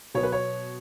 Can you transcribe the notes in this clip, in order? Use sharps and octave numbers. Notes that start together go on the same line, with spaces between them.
B2 F#3 B3 C#5
B4
C#5